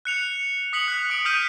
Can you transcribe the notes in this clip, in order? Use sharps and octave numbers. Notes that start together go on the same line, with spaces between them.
F#6 C#7 F7
D#6 B6 C#7 F#7
F#6
D#6 D7
D#6 F6 G6 B6 D#7